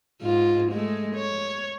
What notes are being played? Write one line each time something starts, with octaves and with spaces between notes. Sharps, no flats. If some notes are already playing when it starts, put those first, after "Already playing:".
G#2 F4
G#3 A3
C#5